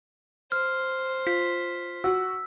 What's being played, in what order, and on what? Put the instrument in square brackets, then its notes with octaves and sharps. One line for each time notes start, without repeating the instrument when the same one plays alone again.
[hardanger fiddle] C5 [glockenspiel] F6
[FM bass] F4 [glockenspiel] B6
[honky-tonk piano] F#4 [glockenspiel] E6